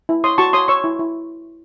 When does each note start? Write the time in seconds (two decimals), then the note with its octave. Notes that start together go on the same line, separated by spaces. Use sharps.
0.09 E4
0.24 C#5 C6 D#6
0.38 F#4 A5 C#6
0.53 C#5 C6 D#6
0.68 C#5 C#6 E6
0.84 E4
0.99 E4